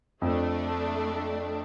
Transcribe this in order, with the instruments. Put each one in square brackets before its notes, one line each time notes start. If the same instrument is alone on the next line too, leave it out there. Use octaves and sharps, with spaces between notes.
[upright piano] F2 [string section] A3 D4